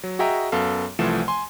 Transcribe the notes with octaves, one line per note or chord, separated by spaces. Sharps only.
F#3
F#4 G#4 D#5 E5 G5 A#5
F#2 B3 A4 F5
C2 E3 F3 A3 C5 E7
G#5 C6